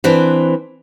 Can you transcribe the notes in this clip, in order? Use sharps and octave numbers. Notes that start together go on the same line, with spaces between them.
E3 C4 D4 B4 C5